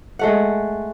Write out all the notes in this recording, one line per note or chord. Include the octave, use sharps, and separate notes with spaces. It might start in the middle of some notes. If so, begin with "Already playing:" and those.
G#3 A3 F#5